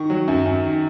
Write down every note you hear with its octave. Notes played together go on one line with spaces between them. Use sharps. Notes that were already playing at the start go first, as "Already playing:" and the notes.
Already playing: D#3 C#6
F#3
F#2
F#2
D#3